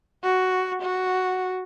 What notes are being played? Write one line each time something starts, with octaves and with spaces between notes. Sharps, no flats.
F#4
F#4